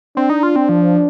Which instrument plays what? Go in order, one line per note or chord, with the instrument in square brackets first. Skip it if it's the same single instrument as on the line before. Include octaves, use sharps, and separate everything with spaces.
[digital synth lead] C4 [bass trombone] D4
[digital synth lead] D#4
F4
C4
F3